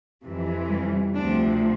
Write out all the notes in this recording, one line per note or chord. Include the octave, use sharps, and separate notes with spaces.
F2 C3 E3
G3
D2 C3 F3 D4